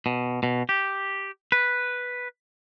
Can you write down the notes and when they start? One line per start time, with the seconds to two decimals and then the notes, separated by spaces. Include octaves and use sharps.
0.06 B2
0.43 B2
0.69 G4
1.52 B4